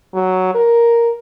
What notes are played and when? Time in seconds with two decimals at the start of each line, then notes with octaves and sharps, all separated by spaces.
0.14 F#3
0.55 A#4